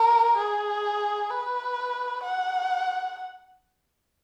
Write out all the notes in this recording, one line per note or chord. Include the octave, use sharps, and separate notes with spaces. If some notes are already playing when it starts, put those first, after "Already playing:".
Already playing: A#4
G#4
B4
F#5